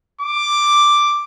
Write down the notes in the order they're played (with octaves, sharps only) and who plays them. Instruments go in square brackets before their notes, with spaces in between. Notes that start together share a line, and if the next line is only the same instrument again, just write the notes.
[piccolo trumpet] D6